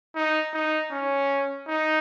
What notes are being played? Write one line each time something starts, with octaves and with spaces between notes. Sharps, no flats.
D#4
D#4
C#4
D#4